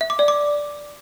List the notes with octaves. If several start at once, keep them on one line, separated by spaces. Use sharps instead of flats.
E5
D6
D5
D6